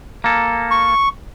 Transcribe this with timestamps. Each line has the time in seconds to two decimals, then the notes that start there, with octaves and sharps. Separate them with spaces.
0.24 A#3 A4
0.71 C#6